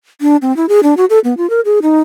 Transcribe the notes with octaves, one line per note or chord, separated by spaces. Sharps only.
D4
C4
E4
G#4
D4
F#4
A4
B3
F4
A#4
G#4
D#4